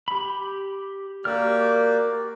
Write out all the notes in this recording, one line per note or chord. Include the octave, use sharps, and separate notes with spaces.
G4 B5
A#3 F#4 G4 A#4 D5 F6